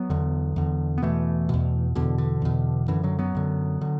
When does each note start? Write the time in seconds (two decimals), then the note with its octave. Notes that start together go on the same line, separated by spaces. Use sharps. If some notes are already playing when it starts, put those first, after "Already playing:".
Already playing: F#3 B3
0.10 E2 D3
0.56 E2 D3
0.98 B3
1.02 E2 B2 E3 A3
1.49 E2 B2
1.95 E2 B2 D3
2.18 D3
2.42 E2 B2
2.88 F#2 D3 E3
3.03 D3 F#3
3.19 F#3 B3
3.35 F#2 D3
3.81 D3